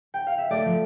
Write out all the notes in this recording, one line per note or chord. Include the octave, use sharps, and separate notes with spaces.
G5
F5
E5
A3 D5
F3